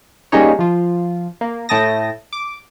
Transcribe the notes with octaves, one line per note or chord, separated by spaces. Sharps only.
G3 G#3 A#3 C#4 D#4 C#5
F3 F4
A#3
A2 A3 G5 A5 D#6 A#6
D6